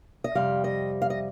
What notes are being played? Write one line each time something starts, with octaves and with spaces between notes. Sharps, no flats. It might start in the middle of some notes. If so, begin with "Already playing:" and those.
D#5
F2 C3 G3 F5
D#5
F5
D#5